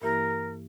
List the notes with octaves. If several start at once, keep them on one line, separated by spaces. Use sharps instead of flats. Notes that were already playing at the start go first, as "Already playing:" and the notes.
G2 E3 A#3 E4 G4 A#4